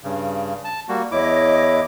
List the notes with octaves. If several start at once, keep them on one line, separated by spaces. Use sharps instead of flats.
G2 C#3
A5
G3 A#3 F#4
E2 E4 C#5 D#5 D6